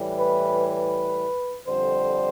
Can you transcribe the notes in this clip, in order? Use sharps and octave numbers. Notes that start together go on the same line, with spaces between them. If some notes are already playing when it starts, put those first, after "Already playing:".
Already playing: A2 E3 G3
B4
B4
F2 D3 G3 C5